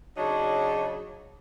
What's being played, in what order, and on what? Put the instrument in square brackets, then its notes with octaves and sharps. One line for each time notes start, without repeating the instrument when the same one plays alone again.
[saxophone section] C#3 F#3 D4 D#4 F#4